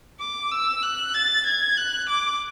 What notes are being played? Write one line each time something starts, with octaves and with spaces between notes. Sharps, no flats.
D6
E6
F#6
A6
G#6
F#6
D6